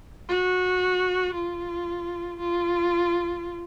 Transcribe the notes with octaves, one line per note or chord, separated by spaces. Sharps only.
F#4
F4
F4